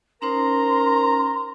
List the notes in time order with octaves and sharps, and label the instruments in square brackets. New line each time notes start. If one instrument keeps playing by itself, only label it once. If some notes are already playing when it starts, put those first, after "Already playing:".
[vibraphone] C#4 D#4 C5 [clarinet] A#4 [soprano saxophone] A#5 [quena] C6